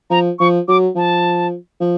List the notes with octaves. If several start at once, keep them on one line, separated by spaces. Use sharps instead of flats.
F3 A#5
F3 C#6
F#3 D6
F3 A5
F3